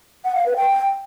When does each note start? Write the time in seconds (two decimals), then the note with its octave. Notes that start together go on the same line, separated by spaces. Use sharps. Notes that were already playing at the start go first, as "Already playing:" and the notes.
0.25 F#5
0.35 F5
0.46 B4
0.56 G5